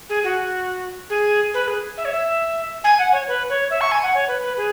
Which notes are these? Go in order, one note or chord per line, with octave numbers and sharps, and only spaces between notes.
G#4
F#4
G#4
B4
G#4
E5
C#5
E5
G#5
F#5
C#5
B4
C#5
E5
C#6
G#5
F#5
C#5
B4
B4
G#4